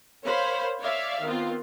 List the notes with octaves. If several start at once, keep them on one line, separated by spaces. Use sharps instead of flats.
A#4 C5 C#5 F5 B5
C#5 D5 E5 F5
D#3 B3 C4 F4